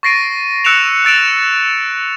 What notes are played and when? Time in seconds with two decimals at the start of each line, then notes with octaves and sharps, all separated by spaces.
0.03 C#6 A6 A#6 C7 D7 D#7
0.65 E6 F#6 C#7 D7 E7 F7
1.05 E6 A6 D7 E7 F7